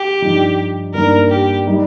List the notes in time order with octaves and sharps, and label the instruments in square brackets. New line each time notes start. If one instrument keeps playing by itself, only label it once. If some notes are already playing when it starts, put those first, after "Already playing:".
Already playing: [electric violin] G4
[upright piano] G2 F3 D#4
[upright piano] G2 D#3 A#3 [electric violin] A#4
[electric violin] G4
[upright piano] G3 D#4